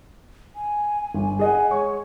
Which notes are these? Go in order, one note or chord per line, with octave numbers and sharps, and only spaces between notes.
G#5
G1
G#4 D#5 F#5 G#5
G#3 C#5 C#6